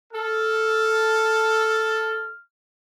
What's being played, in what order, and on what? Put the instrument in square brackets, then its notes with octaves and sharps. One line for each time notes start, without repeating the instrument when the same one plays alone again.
[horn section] A4 [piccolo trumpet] F6